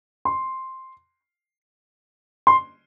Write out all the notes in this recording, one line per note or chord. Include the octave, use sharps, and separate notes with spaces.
C6
C6